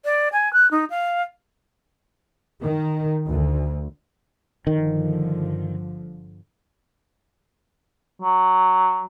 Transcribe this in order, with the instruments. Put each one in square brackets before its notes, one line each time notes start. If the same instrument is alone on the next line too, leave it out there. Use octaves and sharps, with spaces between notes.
[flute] D5
G#5
F#6
D#4
F5
[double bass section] D#3
D2
[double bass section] G1 D3 F3 [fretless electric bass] D#3
[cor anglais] F#3